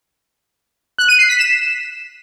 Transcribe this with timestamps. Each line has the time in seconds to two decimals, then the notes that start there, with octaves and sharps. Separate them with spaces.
0.98 F#6
1.09 D#7
1.19 C7
1.29 B6
1.39 E7